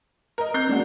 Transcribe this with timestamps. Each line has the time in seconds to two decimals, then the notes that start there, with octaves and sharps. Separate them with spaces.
0.38 A#4 D#5
0.54 C4 A#5 G6 C7
0.69 G#3 A#3 C#4 D4 F#4